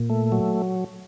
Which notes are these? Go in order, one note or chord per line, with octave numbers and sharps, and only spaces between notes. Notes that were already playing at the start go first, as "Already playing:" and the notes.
Already playing: A#2
A3
F#3